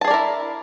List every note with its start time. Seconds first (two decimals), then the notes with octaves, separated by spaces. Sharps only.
0.01 A5
0.04 G#4
0.07 D5
0.11 A#4
0.14 E4